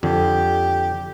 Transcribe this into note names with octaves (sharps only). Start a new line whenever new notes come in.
F2 D3 G4